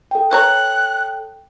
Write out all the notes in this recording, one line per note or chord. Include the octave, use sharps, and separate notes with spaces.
A4 G5
B4 C#5 A#5 F#6